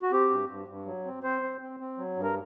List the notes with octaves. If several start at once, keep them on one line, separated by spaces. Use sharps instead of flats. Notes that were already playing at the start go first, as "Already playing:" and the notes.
F#4
C4 G4
G2
G2
G2
F#3
C4
C4 C5
C4
C4
C4
F#3
G2
A#4